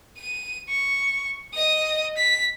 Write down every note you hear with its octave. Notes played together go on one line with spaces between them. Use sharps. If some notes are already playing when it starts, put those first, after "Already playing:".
D#7
C#6
D#5 D#6
B6